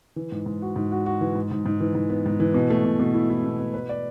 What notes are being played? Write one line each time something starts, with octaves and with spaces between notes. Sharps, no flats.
E3
G#2
G#2
F#4
G#2
F#4
F#4
E3
G#2
G#2
G#2
E3
G#2
B3
G#2
E3
B2
A3
B2
B2
E4
E4
B2
B2
B4
D5